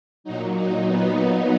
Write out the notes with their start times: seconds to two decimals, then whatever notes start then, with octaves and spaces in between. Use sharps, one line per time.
0.24 A#2 F#3 D#4
0.56 D#4
0.86 B3
1.17 D#4